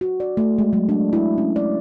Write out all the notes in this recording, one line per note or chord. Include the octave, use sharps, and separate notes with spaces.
F#4
D5
A3
G#3
F#3
D4
E4
C#4
D5